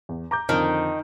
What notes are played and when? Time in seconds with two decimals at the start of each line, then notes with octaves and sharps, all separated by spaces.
0.09 E2
0.31 A#5 D6 G6
0.49 F2 D3 D#3 D#4